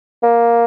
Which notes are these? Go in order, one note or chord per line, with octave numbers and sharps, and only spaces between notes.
A#3